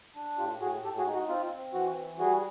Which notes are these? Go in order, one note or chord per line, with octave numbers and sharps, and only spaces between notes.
D4
A2 F4 G4
A2 F#4 G#4
A2 G4 A4
F#4 G#4
D#4
F#4
C4 F4
C4
E3 F#4
E3
G3 F#4 G#4